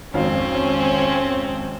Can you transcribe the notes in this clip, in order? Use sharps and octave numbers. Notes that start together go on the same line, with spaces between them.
G#1 F2 C4 C#4 F5